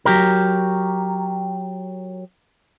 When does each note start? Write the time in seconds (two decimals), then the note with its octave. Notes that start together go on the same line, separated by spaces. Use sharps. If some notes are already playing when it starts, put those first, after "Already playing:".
0.05 F#3 G4 A#4